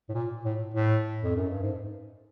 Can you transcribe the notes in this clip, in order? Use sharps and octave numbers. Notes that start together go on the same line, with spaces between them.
A2
A#2
A2
A2
F2
F#2
G2
G#2